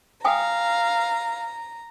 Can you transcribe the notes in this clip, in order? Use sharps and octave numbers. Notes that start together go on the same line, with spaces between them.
F5 G5 G#5 A#5 D#6